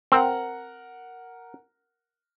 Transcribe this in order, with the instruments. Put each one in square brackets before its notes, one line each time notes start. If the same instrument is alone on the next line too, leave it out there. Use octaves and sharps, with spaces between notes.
[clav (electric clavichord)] C4 [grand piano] A#4 F#5